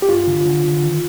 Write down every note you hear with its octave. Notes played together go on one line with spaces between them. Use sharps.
G4
G2 F4
D3
D3
D3
D#3